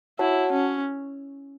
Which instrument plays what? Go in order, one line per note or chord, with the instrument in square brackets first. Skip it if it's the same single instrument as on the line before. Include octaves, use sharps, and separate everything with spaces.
[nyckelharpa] E4 [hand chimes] F#4 C#5 F#5 A5
[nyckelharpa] C#4